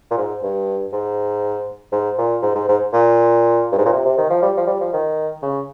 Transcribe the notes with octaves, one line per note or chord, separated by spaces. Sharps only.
A#2
G#2
G2
G#2
G#2
A#2
G#2
G#2
G#2
A#2
G2
G#2
A#2
C3
C3
D#3
F3
G3
F3
G3
F3
D#3
C#3